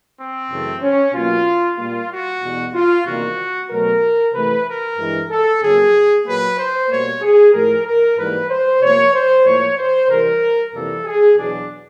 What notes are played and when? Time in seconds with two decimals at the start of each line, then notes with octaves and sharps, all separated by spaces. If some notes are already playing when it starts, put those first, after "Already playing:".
0.18 C4
0.50 F#2 C#3 E3 A3
0.82 C#4
1.14 B2 F#3 A#3 F4
1.78 A#2 G3 A#3 F4
2.10 F#4
2.41 E2 B2 G3
2.73 F4
3.05 E2 C3 D#3 G3 A#3 F#4
3.69 B2 F#3 A3 A#4
4.34 C3 E3 A3 B4
4.66 A#4
4.98 G2 E3 G#3
5.30 A4
5.61 F2 C#3 F#3 A#3 G#4
6.25 A#2 F#3 A#3 B4
6.58 C5
6.89 B2 G3 A#3 C#5
7.22 G#4
7.53 A2 F3 A3 A#4
7.86 A#4
8.18 G#2 E3 G3 A#3 B4
8.50 C5
8.82 C3 F3 A#3 C#5
9.14 C5
9.45 A2 F3 A#3 C#5
9.78 C5
10.09 C3 E3 G3 A#4
10.73 F2 C3 E3 G3 A#3 A4
11.05 G#4
11.37 E2 B2 F#3 D4